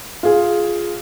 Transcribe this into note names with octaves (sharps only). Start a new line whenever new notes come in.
F4 G#4